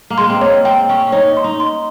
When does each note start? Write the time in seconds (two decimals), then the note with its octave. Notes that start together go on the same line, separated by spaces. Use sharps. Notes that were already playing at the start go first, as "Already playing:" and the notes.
0.10 A#3
0.18 G#3 C6
0.30 C4
0.41 A#3 C#5
0.65 C4 G5
0.89 C#4 G5
1.07 C#4
1.12 D#4 C#5
1.37 C6
1.44 D#4
1.60 C6